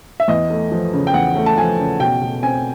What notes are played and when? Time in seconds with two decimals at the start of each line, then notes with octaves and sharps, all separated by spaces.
0.20 E5
0.28 E2 D#5
0.50 A3
0.71 F3
0.93 C#3
1.07 G5
1.14 E2 F#5
1.36 A3
1.46 A5
1.57 F3 G#5
1.79 C#3
2.00 B2 G5
2.21 B2
2.43 C4 G#5